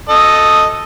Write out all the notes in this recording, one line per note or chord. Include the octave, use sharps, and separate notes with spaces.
A4 D#5